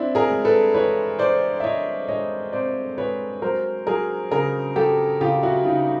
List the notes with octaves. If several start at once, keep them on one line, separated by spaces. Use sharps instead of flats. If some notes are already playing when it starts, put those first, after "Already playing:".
Already playing: C4 D4 E4
G#4 A#4
G#3
A4 B4
E3 B4 C#5
E3 C5 D5
E5
E3 C#5 D#5
G#3 C#5 D#5
C4 C5 D5
G#3 B4 C#5
F#3 A#4 C5
F#3 G#4 A#4
C#3 G#4 A#4
F#3 G4 A4
C#3 F4 G4
E4 F#4
C#3 D#4 F4